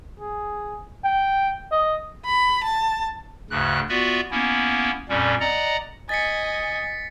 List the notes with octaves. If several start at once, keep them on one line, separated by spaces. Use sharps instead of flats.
G#4
G5
D#5
B5
A5
D2 G2 C#3 F#6
B3 F4 F#4 D5 E5
A#3 B3 C#4 E4
F2 A#2 G3 C#4
D5 D#5 F#5 A#5
D#5 G#5 A6 B6 C#7